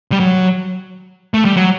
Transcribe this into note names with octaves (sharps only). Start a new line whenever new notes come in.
G3
F#3
A3
G3
F#3